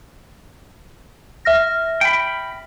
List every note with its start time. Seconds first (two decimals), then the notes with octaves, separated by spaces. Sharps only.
1.45 E5 F6 A#6
2.01 G5 B5